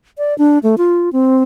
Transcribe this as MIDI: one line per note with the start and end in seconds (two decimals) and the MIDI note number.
0.18 0.36 74
0.38 0.59 62
0.63 0.75 57
0.78 1.12 65
1.13 1.43 60